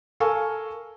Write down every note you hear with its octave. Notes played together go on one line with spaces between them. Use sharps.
A4 A#4 F5 G#5 C#6